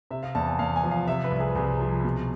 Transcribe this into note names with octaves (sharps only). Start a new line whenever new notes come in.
C3 E5
F5
E2 A5
G#5
E2 F5
G#5
F3
F5
C3 E5
B4
C2
G#4
C2 G#4
F3
B2